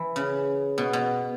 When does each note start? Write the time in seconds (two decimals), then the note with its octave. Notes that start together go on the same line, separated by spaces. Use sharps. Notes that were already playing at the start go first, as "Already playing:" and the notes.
Already playing: E3
0.16 C#3
0.78 B2
0.93 B2